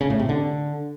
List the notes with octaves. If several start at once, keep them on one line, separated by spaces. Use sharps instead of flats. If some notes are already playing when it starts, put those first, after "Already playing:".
C#3
A2
C3
D3